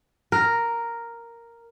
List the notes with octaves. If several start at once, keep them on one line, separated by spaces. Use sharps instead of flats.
A#4